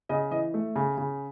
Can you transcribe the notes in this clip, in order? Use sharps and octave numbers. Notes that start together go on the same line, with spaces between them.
C#3 D#5
E3 D#5
A3
C#3
C#3